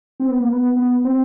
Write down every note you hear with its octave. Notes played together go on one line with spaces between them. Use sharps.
C4
B3
A#3
B3
B3
C4